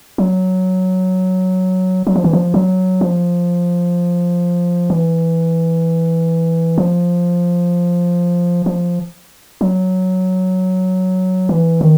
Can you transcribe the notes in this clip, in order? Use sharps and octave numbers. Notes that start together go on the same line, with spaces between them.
F#3
F#3
F3
E3
F3
F#3
F3
E3
F3
F3
F#3
E3
D#3